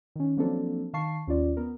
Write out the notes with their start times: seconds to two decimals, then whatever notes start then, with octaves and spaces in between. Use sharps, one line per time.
0.16 D#3 C#4
0.37 F3 F#3 A#3 C4 D4 A4
0.93 D#3 F5 A5 C#6 C7
1.27 D#2 C#4 F4 D5
1.57 B3 A#4